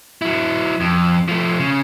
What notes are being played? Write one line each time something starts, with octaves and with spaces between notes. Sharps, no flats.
F#3 E4
F2
F3 A3
C#3